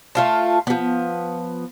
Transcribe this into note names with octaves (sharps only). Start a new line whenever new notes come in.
A3 F4 A5
F3 B3